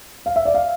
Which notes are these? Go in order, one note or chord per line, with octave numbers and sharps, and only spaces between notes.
F5
E5
D5
F5